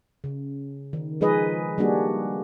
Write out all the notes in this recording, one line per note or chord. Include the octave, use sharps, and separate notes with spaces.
C#3
D#3
F3 G#3 D#4 G#4 B4 D#5
G3 A#3 D4 F#4 G#4